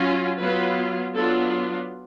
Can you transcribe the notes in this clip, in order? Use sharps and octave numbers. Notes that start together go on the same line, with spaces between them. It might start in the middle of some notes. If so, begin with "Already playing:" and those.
Already playing: F#3 C#4 F4
F#3 B3 F4 B4
F#3 B3 D4 F4 A4